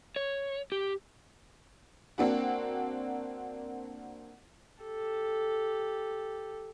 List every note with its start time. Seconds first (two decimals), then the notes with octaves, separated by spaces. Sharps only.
0.16 C#5
0.72 G4
2.18 A#3 C4 D4 F#4
4.83 G4 A4